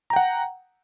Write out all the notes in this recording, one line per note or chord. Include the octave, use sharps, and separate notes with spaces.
F#5 G5 A#5